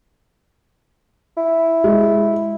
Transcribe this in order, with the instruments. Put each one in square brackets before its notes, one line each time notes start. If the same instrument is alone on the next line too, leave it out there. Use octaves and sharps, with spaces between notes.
[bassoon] E4
[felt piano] G#3